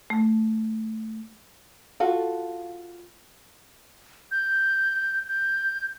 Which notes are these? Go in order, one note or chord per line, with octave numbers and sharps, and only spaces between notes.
A3
F4 F#4 A4 F5
G6
G6